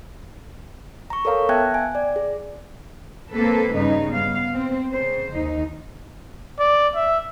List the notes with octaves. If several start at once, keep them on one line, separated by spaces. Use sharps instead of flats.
A#5 C#6
A4 A#4 C#5 F5 A#5
B3 E5 G5 A5 F#6 G#6
G#5
D5
G#4
A#3 C4 A4 B4
G2 C#3 D#4
B3 F5
C4
C#3 C5
D#2 D#4
D5
E5